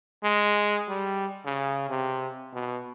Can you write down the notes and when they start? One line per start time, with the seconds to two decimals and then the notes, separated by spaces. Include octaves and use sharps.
0.23 G#3
0.89 G3
1.45 C#3
1.89 C3
2.54 B2